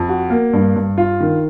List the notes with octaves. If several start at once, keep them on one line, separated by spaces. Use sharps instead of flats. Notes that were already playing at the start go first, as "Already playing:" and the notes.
Already playing: F2
F#4
A#3
G2
G2
F4
D#3